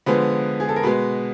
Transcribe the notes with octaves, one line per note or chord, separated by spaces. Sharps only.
D3 F3 G#3 B3 B4
G#4
A4
A#4
B2 G#3 B3 B4